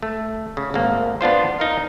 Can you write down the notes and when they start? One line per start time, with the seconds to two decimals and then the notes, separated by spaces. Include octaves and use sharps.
0.02 A3
0.57 C#3
0.74 G#1 A3 A#3
1.21 B3 D4 F4 C5
1.59 D#4 A#4 F5